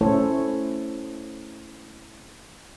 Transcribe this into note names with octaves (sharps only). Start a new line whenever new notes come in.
A3 C#4 E4 A4 C5 C#5